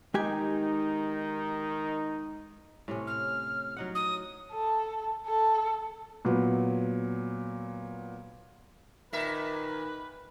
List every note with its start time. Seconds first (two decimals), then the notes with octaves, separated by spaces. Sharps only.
0.14 D#3 G#3 D#4 G4 G#5
2.88 A2 C3 C#4
3.07 F6
3.77 F#3 D#4 F#5
3.95 D#6
4.52 A4
5.27 A4
6.25 A#2 F#3 B3
9.13 A#2 D#3 B4 E5